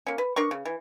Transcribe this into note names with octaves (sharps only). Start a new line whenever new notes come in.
A#3 C#4
B4
D4 A#4 C#6
C#3
E3